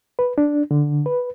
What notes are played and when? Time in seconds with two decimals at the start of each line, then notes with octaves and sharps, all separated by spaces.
0.19 B4
0.38 D4
0.71 D3
1.06 B4